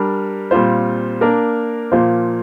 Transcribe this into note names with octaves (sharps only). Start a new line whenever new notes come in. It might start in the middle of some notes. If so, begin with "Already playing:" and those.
Already playing: G3 D4 A#4
A#2 G3 C4 F4 C5
A#3 D4 A#4
A#2 F3 A#3 F4 C5